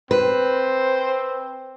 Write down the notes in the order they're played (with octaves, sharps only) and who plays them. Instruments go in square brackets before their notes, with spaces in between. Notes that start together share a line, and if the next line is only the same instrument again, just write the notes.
[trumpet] C4 [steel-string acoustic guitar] B4 [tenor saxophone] C5